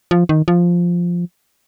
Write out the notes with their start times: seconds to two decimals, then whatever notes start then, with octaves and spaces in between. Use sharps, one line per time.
0.11 F3
0.29 D#3
0.48 F3